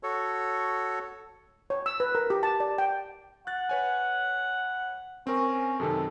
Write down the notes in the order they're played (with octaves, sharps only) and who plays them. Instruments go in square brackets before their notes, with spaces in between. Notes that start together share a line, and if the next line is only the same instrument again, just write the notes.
[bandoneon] F#4 A4 C#5
[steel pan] C#5
E6
B4
A#4
G4
A5
D5
G5
[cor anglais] F#5 [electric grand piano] F#6 A6
[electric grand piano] B4 C#5 G#5
[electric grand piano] C4 A#4 [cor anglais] C#4
[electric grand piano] F#2 C3 D#3 [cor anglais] A4